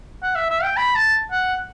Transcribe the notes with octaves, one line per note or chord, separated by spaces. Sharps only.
F#5
E5
E5
G5
B5
A5
F#5